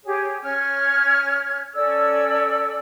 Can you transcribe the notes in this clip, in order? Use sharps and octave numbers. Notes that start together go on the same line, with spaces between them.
G4 G#4 C#5
C#4 C#5 F6 G#6
C#4 A4 D5 E6